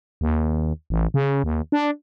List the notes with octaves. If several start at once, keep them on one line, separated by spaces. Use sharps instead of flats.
D#2
A1
C#3
D#2
D4